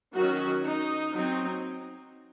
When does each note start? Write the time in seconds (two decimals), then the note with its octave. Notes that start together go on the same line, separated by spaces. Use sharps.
0.15 D#3 F#3 C#4 F#4
0.64 D#4
1.13 F#3 C4 D#4